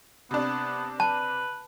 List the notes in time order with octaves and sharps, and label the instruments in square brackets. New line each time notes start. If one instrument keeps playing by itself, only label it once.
[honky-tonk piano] C3 D4 [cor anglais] B3
[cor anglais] B4 [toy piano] A5